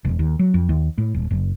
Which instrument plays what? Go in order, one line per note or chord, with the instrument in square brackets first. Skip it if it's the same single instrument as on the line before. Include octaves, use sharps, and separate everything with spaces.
[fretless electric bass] E1
D#2
F#3
F2
D#2
A2
D#1
F#1